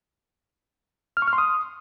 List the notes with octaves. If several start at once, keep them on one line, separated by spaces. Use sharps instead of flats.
F6
C#6
F6
C6
D#6